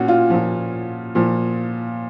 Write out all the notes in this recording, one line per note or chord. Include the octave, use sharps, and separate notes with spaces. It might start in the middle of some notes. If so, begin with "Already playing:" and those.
Already playing: A#2 C#4 F#4
F4
A#2 F3
A#2 F3